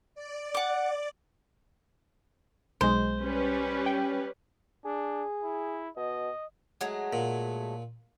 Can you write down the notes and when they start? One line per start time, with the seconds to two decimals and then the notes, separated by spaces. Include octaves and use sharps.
0.15 D5
0.55 F#5 D6
2.81 B1 G#3 C5
3.22 G3 C#4 B4
3.86 G5
4.85 D4 G#4
5.43 E4
5.97 B2 D#5
6.81 F#3 G#3 A3
7.13 A#2